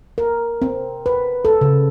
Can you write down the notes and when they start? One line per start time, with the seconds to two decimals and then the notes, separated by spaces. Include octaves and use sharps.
0.18 A#4
0.62 C4
1.06 B4
1.45 A4
1.61 C#3